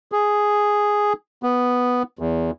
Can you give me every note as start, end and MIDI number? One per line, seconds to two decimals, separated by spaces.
0.12 1.13 68
1.43 2.03 59
2.19 2.51 40